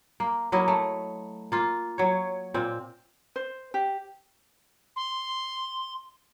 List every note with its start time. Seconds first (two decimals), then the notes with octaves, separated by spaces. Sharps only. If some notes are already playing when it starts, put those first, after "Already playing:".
0.20 A#3
0.52 F#3 A#3 E4 D#5
0.68 A3
1.52 A#3 F4
1.98 F#3 C#5
2.54 A#2 C4
3.36 C5
3.74 G4
4.96 C6